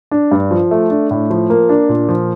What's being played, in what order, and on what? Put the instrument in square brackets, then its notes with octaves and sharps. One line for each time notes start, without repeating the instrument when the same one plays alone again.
[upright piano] D4
G2
F3
A3
D4
A2
F3
A#3
D4
A#2
F3